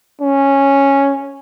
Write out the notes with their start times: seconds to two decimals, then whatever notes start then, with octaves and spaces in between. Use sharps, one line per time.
0.21 C#4